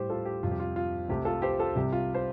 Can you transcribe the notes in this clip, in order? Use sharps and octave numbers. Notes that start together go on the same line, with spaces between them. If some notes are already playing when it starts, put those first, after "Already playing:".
Already playing: A2 G3 G4 C5
F4 A4
G4
F2 C3 G3 F4
G4
F4
F4
C2 C3 A3 G4
F4 A4
G4 C5
F4 A4
C2 C3 G3 G4
F4
C5